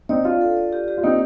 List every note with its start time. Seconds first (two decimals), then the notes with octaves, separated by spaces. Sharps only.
0.09 C4 D#4 D5
0.25 D4 F4 F5
0.41 A4
0.57 D5
0.73 G4
0.88 G4
0.98 F4
1.03 A#3 C4 D#4